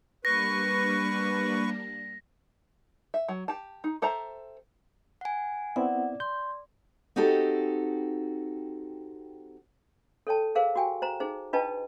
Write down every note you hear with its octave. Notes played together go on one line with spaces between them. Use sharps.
G3 A#3 D4 B4 C#6 A#6
E5
F#3
G4 A5
D#4
G4 A4 C5 E5 A#5
F#5 G#5
B3 C4 E4 D5 F#5
C6 G6
C4 D#4 F#4 G4 A4
A4 C#5 G5 A5
G#4 A#4 C5 F5
F#4 G4 G5 G#5
C5 A#5
D#4 G#4 C5
D4 F4 B4 D#5 G5 A5